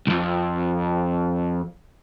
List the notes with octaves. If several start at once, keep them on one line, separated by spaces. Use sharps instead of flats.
C2 F2